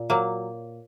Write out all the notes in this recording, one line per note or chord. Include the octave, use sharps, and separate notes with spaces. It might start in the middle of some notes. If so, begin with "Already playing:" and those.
Already playing: A#2
F#3 A#3